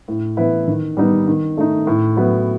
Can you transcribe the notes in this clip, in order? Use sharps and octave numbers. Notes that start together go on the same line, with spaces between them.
A2
E3 B3 E4 B4
D#3
G3 B3 D#4
D#3
A3 D#4
A2
F#3 B3 E4